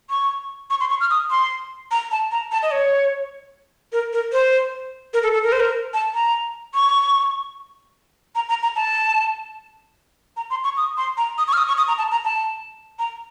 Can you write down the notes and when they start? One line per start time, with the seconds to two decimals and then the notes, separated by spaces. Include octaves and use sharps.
0.10 C#6
0.70 C#6
0.80 C6
0.90 C#6
1.01 F6
1.10 D#6
1.31 C6
1.91 A#5
2.11 A5
2.31 A#5
2.52 A5
2.62 D#5
2.71 C#5
3.92 A#4
4.13 A#4
4.33 C5
5.14 A#4
5.23 A4
5.33 A4
5.44 A#4
5.52 C5
5.60 A#4
5.94 A5
6.14 A#5
6.74 C#6
8.35 A#5
8.49 A#5
8.63 A#5
8.76 A5
10.37 A#5
10.50 C6
10.64 C#6
10.77 D#6
10.97 C6
11.17 A#5
11.38 D#6
11.48 C#6
11.53 F6
11.58 D#6
11.68 C#6
11.78 D#6
11.88 A#5
11.98 A5
12.12 A#5
12.25 A5
12.99 A#5